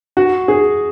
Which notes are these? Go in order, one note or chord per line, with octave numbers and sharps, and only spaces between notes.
F#4
G#4